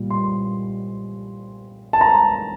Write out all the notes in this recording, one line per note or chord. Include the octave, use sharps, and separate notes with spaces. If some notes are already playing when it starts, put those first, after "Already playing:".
Already playing: A#2 G3
C6
A5
A#5